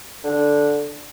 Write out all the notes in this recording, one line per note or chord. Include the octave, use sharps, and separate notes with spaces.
D3